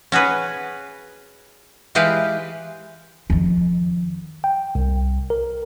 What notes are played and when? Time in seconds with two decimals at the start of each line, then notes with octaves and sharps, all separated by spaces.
0.12 C#4 F#4 G#4 B4
1.95 E3 G#3 G4 B4 F5
3.30 F2 D#3
4.44 G5
4.75 C2
5.30 A#4